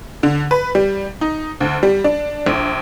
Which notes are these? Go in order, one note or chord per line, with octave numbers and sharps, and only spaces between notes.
D3
B4
G3
D#4
D2
G3
D4
A#1